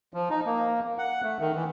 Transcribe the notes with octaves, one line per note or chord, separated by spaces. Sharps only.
F3
D#4
A#3
F#5
A3
D#3
E3